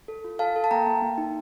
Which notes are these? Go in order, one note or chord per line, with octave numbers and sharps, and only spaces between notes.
A4
F4
A4 F5 A5
A4
A5
A#3 G5 A#5
A#3
A#3
D#4